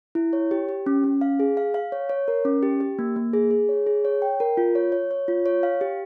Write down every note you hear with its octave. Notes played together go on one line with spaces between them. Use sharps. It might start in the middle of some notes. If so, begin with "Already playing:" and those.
E4
C#5
G4
G4
C#4
C#4
F5
G#4
F5
F5
C#5
C#5
A#4
C#4
G4
G4
A#3
A#3
G#4
G#4
C#5
G#4
C#5
G5
A#4
F4
C#5
C#5
C#5
F4
C#5
F5
G4